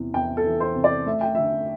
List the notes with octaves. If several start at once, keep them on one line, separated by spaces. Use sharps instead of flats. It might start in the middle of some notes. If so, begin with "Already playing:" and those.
Already playing: E2 C3 E3
E2 G5
A4
E3
C5
C3
D5
A3 E5
G5
D3 E5